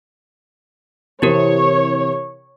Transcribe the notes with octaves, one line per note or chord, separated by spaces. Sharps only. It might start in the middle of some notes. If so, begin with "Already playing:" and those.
C3 E3 C4 E4 G4 A#4 C#5